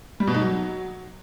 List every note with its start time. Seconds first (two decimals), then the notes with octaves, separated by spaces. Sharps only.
0.20 G3
0.27 B2
0.35 D#4
0.42 F#3